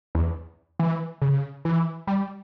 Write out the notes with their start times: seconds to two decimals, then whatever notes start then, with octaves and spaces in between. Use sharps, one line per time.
0.15 E2
0.79 E3
1.22 C#3
1.65 E3
2.07 G3